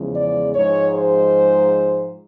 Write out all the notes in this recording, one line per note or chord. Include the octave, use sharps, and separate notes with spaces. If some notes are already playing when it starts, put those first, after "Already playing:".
Already playing: E2 C#3 F3 G#3
D5
G#2 F3 G#3 C#5
C5